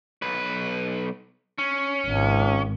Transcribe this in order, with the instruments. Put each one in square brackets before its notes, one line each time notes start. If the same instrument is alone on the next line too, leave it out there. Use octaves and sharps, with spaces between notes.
[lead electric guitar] B1 B4
C#4
[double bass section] G#1 [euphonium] C#2